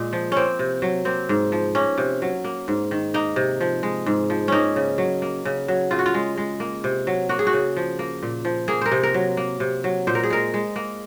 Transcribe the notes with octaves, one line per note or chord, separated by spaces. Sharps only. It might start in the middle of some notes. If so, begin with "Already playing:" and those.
Already playing: A#2 G#3
F3
A#3 C4 C#4
C3
F#3
A#3 C4
G#2
F3
A#3 C#4
C3
F#3
A#3
G#2
D#3
A#3 D#4
C3
F3
G#3
G#2
F3
A#3 C#4 D#4
C#3
F#3
A#3
C#3
F#3
C#3 F4
F#4
F4
G#3
G#3
A#3
C3
F#3
A#3 F#4
G#4
F#4
C#3
F3
A#3
A#2
F3
A#3 G#4
A#4 C5
C3
A#4
F#3
A#3
C3
F#3
A#2 C5
A#4
G#4
G#3 A#4
G#3
A#3